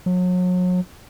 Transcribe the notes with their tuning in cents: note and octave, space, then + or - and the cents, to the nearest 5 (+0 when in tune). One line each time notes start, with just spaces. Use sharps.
F#3 -35